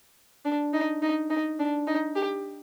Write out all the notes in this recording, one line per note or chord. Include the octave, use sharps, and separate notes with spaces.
D4
D#4
D#4
D#4
D4
D#4
G4